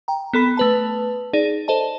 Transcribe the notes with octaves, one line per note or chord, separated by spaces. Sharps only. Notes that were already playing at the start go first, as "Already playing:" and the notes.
G5 A#5
B3 A4 B5 B6
A3 B4 A5
D#4 G#4 D5
A4 C5 D#5 A5